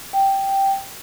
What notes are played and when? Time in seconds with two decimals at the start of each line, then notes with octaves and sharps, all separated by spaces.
0.13 G5